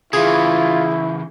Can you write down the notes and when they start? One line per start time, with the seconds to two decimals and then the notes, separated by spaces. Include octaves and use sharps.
0.13 C#3 E3 E4 F4 G#4